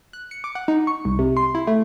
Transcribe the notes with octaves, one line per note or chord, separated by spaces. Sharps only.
F#6
C#7
D6
F#5
D#4
C#6
C2
C3
C6
E4
A3